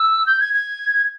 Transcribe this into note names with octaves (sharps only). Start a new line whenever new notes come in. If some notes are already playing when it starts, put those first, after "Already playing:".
Already playing: E6
G6
G#6
G#6